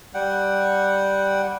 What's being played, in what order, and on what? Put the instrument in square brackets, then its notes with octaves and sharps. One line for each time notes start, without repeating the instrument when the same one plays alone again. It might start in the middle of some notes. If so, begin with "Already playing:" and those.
[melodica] G3 F#5 G5